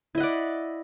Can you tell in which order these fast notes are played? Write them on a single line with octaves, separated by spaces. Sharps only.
E4 D#5 F#5 D5